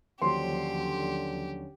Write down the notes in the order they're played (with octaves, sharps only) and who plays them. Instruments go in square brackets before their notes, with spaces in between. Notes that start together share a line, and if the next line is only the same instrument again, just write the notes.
[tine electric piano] D#2 F3 F#3 [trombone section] D3 C#4 [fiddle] G4 [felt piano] C6